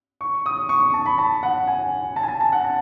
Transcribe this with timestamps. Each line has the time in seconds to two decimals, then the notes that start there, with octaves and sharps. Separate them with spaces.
0.21 C#6
0.46 D#6
0.69 C#6
0.94 A5
1.06 B5
1.18 A5
1.43 F#5
1.67 G#5
2.16 A5
2.23 G#5
2.28 A5
2.41 A5
2.52 F#5
2.64 A5